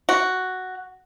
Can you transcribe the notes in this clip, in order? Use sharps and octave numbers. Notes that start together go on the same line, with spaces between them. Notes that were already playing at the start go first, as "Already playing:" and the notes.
F#4